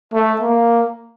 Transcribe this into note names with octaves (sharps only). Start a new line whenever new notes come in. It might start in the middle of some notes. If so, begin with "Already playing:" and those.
A3
A#3